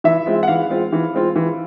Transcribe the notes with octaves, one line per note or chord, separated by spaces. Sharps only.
E3 E5
G#3 C4 F4
F#5
E3 F5
G#3 C4 F4
E3
G#3 C4 F4
E3